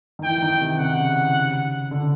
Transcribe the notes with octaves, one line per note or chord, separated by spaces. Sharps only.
D#3
E3 G5
D#3
C3
C#3 F#5
D3